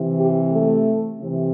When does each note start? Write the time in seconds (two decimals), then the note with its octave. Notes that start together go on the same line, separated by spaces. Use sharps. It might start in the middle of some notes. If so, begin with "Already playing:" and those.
Already playing: C3 E3
0.18 G4
0.52 A3
1.21 C3 E3